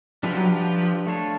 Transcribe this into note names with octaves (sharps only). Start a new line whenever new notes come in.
F3 D4 G4 B4 E5
F#3
F3
A3 D4 F4 A4 C#5